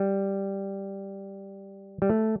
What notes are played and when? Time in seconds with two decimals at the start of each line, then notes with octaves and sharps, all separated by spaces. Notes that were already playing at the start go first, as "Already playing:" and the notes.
Already playing: G3
2.02 G3
2.09 A3